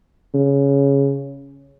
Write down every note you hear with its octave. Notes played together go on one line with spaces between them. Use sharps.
C#3